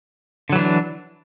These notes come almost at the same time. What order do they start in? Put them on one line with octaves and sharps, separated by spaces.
D3 F#3 E3 D4